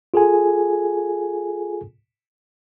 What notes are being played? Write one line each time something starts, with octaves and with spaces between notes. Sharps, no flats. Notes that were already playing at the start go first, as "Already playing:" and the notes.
F4 G#4 A4 G#5